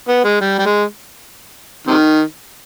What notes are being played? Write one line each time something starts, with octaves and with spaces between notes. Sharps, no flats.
B3
G#3
G3
G3
G#3
C3 D#3